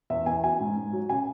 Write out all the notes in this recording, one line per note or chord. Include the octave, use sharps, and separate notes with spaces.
E2 E5
E2 G#5
F#3 G#5
G#2
G#2
F#3
C#3 G#5